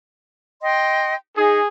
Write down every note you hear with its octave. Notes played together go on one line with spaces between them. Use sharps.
D#5 G5 C6
D#4 G#4